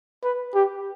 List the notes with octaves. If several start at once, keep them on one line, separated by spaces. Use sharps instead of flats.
B4
G4